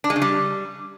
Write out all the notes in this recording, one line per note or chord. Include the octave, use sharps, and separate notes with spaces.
D4
G#3
C#3
G3